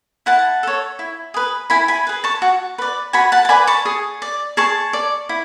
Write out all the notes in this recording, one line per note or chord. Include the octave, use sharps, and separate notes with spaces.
E4 F#5 A5
A4 C#5
E4
G#4 B4
E4 G#5 B5
G#5 B5
G#4 B4
A5 C#6
F#4
B4 D5
F#4 G#5 B5
F#5 A5
A5
B4 D5 G#5 B5
A5 C#6
G#4
D5
G#4 A5 C#6
D5
E4